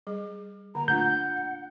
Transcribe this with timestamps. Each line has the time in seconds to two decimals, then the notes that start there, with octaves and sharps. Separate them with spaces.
0.07 G3 G#4
0.75 D3 A#3 A#5
0.88 A3 D4 F4 F#5 G6